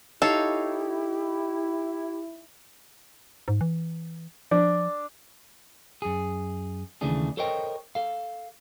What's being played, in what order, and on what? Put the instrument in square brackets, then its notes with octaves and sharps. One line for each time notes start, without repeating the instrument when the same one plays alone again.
[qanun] D#4 C#5 F5 [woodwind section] E4 [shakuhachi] G4 [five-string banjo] A4
[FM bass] G#2
E3
[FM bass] F3 [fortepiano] D4
[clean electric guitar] F#2 G#4
D#2 C#3 E3 A3 D4 G#4
A4 A#4 C5 C#5 D#5 G5
A4 F5